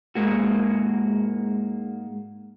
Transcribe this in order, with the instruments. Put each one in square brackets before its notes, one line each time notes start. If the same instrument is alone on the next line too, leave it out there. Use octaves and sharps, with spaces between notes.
[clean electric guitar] G#2 G#3 A#3 F#4